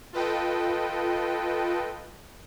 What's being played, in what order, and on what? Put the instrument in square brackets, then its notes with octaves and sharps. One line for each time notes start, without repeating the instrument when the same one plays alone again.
[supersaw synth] F4 A4 B4 D#5 G5